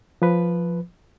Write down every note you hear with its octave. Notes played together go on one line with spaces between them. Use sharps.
F3 B4